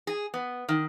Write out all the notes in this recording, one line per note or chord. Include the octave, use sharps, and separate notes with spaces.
G#4
B3
D#3